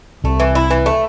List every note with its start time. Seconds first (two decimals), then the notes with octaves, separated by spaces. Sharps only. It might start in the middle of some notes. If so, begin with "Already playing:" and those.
0.24 C2 C3 A3
0.40 E3
0.55 E4
0.71 E3
0.86 A3